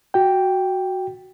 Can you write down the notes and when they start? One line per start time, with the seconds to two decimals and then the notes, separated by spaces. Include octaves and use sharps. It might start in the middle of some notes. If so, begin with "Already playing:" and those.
0.14 F#4 G5